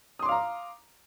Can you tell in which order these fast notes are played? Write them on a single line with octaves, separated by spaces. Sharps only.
D#6 C6 D6 F5 A#5